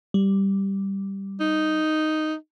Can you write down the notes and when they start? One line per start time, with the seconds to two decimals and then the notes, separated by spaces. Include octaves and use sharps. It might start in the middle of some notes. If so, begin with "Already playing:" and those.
0.14 G3
1.40 D#4